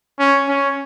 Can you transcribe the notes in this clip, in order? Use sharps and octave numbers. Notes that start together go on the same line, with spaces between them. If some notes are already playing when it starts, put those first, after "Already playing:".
C#4
C#4